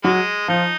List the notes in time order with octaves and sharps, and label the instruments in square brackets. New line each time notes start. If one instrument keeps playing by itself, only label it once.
[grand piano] F#3 F#4 [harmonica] G#3
[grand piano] F3 F4 [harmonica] D#4